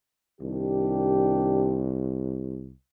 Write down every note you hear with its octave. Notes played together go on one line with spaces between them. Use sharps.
C2 D#3 D4 G4